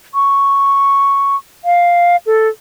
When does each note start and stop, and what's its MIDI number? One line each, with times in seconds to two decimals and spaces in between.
0.14 1.36 85
1.65 2.16 77
2.26 2.48 69